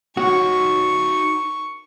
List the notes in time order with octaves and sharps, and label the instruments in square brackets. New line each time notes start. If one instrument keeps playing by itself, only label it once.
[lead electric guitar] D#4 C#5 [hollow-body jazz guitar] F#4 [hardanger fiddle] C#6